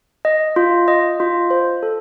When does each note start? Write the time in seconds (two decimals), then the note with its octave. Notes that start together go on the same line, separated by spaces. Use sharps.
0.25 D#5
0.56 F4
0.88 D#5
1.20 F4
1.50 C5
1.83 A4